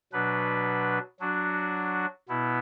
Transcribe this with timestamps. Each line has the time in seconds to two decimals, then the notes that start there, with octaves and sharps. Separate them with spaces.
0.13 B2 F#3 D4 B4
1.20 F#3 D4 F#4
2.28 B2 B3 E4